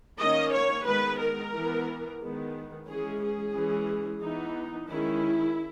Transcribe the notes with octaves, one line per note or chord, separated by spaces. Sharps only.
D#3 A#3 C#4 D#5
C#5
D#3 G#3 B3 B4
A#4
E3 B3
D#3 G#3 B3
E3 G#3 C#4 G#4
G#4
E3 G#3 C#4
E3 B3 D#4
D#3 G#3 C#4 E4